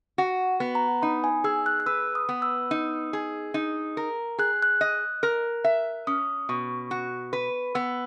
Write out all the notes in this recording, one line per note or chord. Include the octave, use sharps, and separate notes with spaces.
F#4 F#5
B3
A#5
D#4 B5
G#5
G#4 E6
F#6
F#6
B4 E6
D#6
B3
E6
D#4
G#4
D#4
A#4
G#4 F#6
F#6
D#5
A#4
E5
C#4 D#6
B2 C#6
F#4
B4
B3 E6